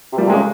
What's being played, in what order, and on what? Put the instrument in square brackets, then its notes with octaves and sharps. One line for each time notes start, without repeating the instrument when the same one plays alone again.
[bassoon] C3
[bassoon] A#2 [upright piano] G3
[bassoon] C3
[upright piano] G#3
[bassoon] C#3